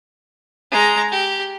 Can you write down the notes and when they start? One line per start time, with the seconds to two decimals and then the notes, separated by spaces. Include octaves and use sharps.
0.72 G#3 A#5
1.11 G4